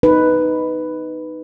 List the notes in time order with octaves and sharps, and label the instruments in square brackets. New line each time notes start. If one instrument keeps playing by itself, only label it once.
[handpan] D#4 B4